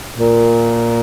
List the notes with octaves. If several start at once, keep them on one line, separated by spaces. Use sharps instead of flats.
A#2